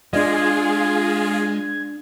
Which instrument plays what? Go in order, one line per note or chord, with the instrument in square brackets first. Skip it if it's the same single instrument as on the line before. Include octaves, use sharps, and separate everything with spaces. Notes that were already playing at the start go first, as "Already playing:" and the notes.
[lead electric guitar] G#3 [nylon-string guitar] D4 D5 D#5 [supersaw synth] F4 G#4 [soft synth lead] G#6